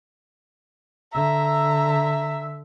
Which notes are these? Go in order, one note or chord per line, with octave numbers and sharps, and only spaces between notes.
D3 E5 A#5